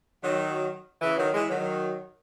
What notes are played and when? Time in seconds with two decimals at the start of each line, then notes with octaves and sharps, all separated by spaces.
0.22 D#3 F#3
1.02 C#3 E3
1.18 D#3 F#3
1.33 E3 G#3
1.49 D#3 F#3